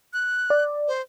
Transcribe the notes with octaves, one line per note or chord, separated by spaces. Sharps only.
F#6
D5
C5